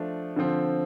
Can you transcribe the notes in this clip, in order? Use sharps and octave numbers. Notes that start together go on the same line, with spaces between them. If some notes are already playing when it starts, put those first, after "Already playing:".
Already playing: F3 A3 D4
D3 F3 C4